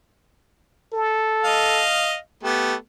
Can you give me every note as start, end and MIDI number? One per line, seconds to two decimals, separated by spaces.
0.93 1.83 69
1.44 2.17 75
1.44 2.17 77
2.43 2.74 57
2.43 2.74 59
2.43 2.75 67